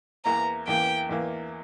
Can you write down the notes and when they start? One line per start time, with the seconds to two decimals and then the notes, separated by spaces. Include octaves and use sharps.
0.25 E2 E3 A#3 A#5
0.67 E2 E3 A#3 G5
1.09 E2 E3 A#3